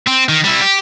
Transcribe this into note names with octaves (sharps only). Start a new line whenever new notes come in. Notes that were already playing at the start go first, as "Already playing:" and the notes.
C4
D#3
G3 E4
G4